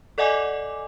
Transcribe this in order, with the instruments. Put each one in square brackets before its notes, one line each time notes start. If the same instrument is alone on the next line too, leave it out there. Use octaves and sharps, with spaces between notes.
[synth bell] A4 D5 D#5 F#5 G#5 D6